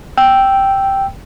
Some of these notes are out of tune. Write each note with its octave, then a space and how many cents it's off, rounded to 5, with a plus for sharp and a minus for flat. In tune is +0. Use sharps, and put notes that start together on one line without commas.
G5 -5 E6 +0